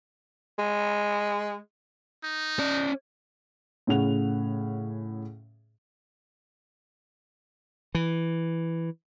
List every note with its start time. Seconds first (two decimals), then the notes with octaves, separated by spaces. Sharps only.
0.59 G#3
2.24 D#4
2.59 C#4 D5
3.87 A2 C#3 C#4 G#4 F#5 F7
7.95 E3